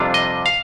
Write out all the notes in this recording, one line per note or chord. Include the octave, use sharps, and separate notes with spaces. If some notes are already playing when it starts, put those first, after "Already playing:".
Already playing: F2 C3 G3 D4 F4
D#5
F5